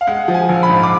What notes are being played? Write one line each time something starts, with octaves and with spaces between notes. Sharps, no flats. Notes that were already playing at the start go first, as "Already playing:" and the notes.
F5
G#3 F#5
F3
G#5
A#1
B5
G#2
D6